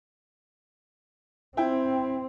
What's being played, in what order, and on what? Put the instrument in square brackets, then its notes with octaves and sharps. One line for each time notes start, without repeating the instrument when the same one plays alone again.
[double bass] C4 [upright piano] E4 G5